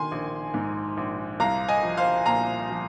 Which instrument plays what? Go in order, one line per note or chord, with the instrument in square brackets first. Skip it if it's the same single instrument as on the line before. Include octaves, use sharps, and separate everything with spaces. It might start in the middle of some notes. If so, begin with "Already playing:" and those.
Already playing: [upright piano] D#3 G#5 C6
A#1
G#2
A#1
C2 F5 A#5
D#5 G#5
F3
C5 F5
A#2 F5 A#5
F3